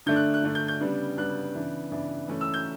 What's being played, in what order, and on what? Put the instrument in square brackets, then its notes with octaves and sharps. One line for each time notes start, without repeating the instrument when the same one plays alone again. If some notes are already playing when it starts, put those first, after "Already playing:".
[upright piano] D3 A3 D4 G6
F#6
F#6
D3 A3 D4
G6
G6
C#3 G3 B3 D4
C#3 G3 B3 D4 F#6
C#3 E3 B3 D4
C#3 E3 B3 D4
E3 A3 C#4
E6
G6